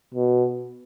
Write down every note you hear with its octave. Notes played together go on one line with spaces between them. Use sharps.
B2